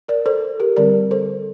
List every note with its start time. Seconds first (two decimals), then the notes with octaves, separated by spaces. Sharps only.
0.08 A#4 D5
0.26 A4 C5
0.60 G4 A#4
0.76 D3 G3 C4 A#4 D5
1.11 A4 C5